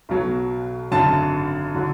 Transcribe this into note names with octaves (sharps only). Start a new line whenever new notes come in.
B1 B2 F#3
G#1 F#2 D3 F#3 A5
D3 F#3